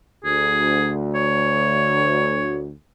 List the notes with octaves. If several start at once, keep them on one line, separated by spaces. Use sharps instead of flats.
D2 G#4
C#5